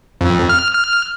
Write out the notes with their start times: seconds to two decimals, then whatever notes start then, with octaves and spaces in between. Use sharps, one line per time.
0.21 F2
0.49 F6
0.75 F6